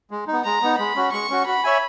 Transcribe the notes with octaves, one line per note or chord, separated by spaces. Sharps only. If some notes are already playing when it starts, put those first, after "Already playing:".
G#3
D#4
B3
G#3 A#5
B3 D#4
G#3 B5
C#4 F#4
G#3 C#6
C#4 F#4
F#4 B5
C#5 E5 G#5